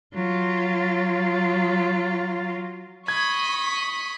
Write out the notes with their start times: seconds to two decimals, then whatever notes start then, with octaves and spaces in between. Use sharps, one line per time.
0.14 F#3 F4
3.08 D#5 B5 C#6 G#6